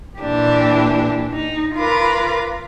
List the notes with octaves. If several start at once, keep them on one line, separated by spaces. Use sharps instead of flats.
A#2 E3 D4 G4
D#4
F4 A#4 B4 B5 D6